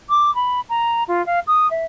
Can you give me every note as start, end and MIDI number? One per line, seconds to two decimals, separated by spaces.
0.09 0.33 86
0.35 0.60 83
0.69 1.03 82
1.08 1.25 65
1.26 1.40 77
1.47 1.67 87
1.70 1.85 76